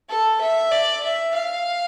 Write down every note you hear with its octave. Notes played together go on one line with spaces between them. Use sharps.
A4
E5
D5
E5
F5